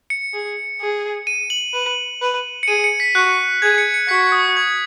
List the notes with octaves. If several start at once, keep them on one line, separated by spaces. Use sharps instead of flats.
C#7
G#4
G#4
D#7
F#7
B4
B4
C#7
G#4 D#7
C#7
B6
F#4 F#6
G#4 G#6
C#7
C#7
F#4 B6
D#6
G#6